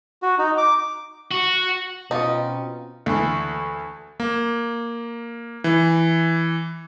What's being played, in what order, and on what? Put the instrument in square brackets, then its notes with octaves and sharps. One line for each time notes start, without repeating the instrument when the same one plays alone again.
[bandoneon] F#4
D#4
D6
[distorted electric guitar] F#4
[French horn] B2 [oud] C4 C#4 F4 [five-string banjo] D#4
[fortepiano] D2 E3
[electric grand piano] A#3
E3